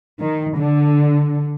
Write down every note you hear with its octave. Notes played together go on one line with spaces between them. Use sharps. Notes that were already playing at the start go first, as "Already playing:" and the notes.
D#3
D3